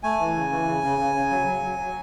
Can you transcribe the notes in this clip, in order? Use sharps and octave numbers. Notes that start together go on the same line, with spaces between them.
A3 G#5
E3
C#3
E3
C#3
C#3
C#3
C#3
F#3
F#3
F#3
F#3